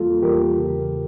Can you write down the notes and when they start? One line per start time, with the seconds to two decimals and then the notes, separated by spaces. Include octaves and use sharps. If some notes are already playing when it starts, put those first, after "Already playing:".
Already playing: E2 E3 G3 A#3 F4 A4
0.22 E2 E3 G3 A#3 G4 A#4
0.57 E2 C#3 E3